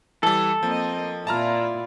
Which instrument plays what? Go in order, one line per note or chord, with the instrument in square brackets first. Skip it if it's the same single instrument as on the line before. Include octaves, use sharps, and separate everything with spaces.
[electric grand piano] E3 G3 [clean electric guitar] A4
[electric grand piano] F3 [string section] A#3 D#5 [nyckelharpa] C4
[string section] A#2 E4 D5 [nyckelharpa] F4 [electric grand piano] A5 A#5 F6